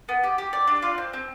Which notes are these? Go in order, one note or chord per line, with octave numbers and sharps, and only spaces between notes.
B3
G4
G4
D5
D4
F4
C4
C4